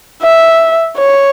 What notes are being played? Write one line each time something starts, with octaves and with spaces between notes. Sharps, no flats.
E5
C#5